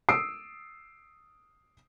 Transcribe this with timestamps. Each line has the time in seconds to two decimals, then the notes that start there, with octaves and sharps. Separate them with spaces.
0.09 D#6 E6 C7 D7